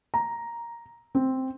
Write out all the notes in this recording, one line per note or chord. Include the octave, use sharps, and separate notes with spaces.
A#5
C4